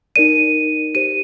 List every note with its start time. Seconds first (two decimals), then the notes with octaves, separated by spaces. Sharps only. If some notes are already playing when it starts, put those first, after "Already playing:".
0.16 D#4 A#4 D5 D#7
0.95 G4 C5 D#7